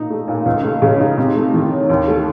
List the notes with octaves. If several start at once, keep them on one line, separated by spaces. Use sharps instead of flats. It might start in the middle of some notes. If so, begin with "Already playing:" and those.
Already playing: A#2 D#4
A3
A#2
C#2
A3
C#3
D#4
C3
A3
D#3
C#4
D#2
A3